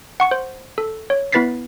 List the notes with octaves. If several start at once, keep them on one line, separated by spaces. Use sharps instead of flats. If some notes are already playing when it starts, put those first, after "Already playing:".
F#5 C#6 C#7
C5
A4
C#5
B3 E4 B4 A6 B6 C7